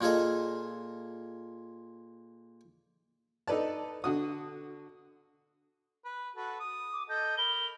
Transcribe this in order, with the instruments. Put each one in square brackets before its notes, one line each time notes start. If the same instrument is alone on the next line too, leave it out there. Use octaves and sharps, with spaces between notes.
[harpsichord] A#2 F4 G#4 A4 D#5
[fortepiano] D#4 A4 B4 D5 A5
D3 F#4 D#6
[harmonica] B4
F#4 A4 B4
D#6
[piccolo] D6
[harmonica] A4 D#5 [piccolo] G6
[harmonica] A#4 B5 [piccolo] G7